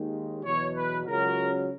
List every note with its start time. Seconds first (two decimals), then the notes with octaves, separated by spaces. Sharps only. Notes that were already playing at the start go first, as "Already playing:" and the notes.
Already playing: D#2 D#3 G#3
0.45 E2 B2 F#3 C#5
0.76 B4
1.07 C#2 C#3 F#3 A#4